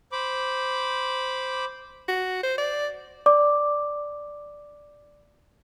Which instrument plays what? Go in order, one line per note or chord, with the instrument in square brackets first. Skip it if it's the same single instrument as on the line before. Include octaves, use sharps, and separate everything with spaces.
[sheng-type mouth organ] C5 B5 D6
[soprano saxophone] F#4
C5
D5
[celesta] D5 D6